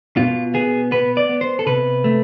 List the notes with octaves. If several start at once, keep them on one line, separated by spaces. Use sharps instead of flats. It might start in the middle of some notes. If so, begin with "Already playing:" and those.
B2 F4
B3 G#4
B3 B4
D5
B3
C5
A4
C3 B4
A3